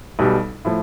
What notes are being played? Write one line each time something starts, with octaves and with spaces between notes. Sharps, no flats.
B1 B2 G3
A2 F3